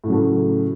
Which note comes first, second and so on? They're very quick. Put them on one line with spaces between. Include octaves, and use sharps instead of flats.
A2 C#3 F#3 A3